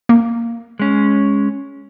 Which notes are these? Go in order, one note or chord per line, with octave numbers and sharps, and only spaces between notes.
A#3
G#3 C#4